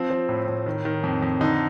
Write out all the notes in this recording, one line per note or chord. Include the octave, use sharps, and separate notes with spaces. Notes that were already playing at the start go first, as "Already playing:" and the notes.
Already playing: F3 C4
F3
A2
A2
D#3
D#3
F2
F2
D3 D#4